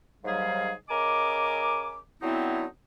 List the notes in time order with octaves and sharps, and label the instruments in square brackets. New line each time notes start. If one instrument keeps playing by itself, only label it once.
[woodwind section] D#2 G#2 F#3 G3 G#4 F5
C#3 A#4 D#5 G#5 D6
D3 F#3 B3 C4 D#4 E4